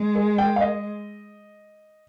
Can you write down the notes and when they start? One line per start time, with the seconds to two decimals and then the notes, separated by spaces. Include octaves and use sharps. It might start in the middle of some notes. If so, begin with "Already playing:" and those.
Already playing: G#3
0.16 G#4
0.38 G5
0.56 F5
0.61 D#5